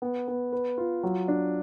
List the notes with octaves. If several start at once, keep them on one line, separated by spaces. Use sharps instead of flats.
B3
B3
B4
F4
F#3
D4